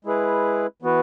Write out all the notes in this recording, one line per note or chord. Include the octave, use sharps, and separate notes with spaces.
G#3 E4 G#4 B4
E3 B3 F#4 B4